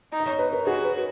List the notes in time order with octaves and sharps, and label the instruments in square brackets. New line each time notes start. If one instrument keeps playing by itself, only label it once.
[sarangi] D#4
[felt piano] D#5
C#5
B4
A#4
[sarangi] F#4 [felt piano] G#4
[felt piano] B4